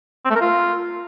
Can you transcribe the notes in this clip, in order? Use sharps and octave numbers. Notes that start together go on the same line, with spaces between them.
C4
A3
A#4
F4